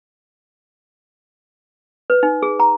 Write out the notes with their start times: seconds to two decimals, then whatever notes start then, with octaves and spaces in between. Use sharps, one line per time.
2.10 B4
2.23 D#4
2.42 G#4
2.60 A#5